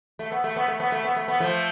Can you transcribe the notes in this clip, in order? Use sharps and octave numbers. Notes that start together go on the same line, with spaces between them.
A3
B3
A3
B3
A3
B3
A3
B3
A3
B3
F3 A3